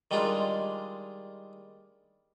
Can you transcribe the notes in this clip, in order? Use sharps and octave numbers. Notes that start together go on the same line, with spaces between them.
D#3 G3 G#3 D4 F4